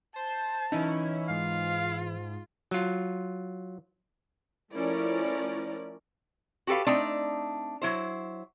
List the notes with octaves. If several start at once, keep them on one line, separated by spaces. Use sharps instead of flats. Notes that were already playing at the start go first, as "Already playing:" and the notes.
C5 A5
E3 C#4 D#4 E4
G#2 F4 F5
F#3 F4
F3 A3 C#4 E4 A#4 D5
F#4 G4 A4 B4 F5
A3 C4 D4 D#4
F#3 E4 C5